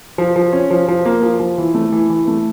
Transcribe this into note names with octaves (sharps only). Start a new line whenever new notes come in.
F3
F3
C#4
F3
F3
A#3
F3
F3
E3
A3
E3
E3
A3